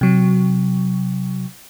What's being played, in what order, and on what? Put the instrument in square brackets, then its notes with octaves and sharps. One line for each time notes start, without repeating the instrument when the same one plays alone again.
[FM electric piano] C3 F#3